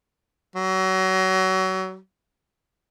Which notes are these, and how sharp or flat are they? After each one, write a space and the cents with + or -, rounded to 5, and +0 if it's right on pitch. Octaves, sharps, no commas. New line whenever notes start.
F#3 +30